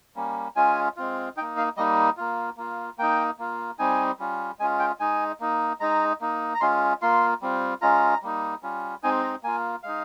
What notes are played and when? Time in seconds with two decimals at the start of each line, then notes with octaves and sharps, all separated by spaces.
0.16 G3 A#3 C#4
0.56 G#3 C#4 F4 G#5
0.97 G#3 C4 F4
1.37 D#4 G5
1.41 A#3
1.57 F5
1.77 G3 A#3 D#4 D#5
2.17 A#3 F4
2.57 A#3 F4
2.98 A#3 D#4 G5
3.39 A#3 F4
3.79 G3 C4 D#4 G#5
4.19 G3 C#4 F4
4.59 G#3 C#4 F4 G#5
4.79 G5
5.00 G#3 D#4 G#5
5.40 A#3 D#4
5.80 G#3 D#4 A#5
6.21 A#3 D#4
6.55 A#5
6.61 G#3 C#4 F4 C6
7.02 A#3 F4 C6
7.42 G3 C4 F4
7.82 G#3 C#4 F4 A#5
8.23 G3 A#3 D#4
8.63 G3 C#4 F4
9.03 G#3 C4 D#4 G#5
9.24 A#5
9.43 A#3 F4 G#5
9.83 G#3 D#4 F5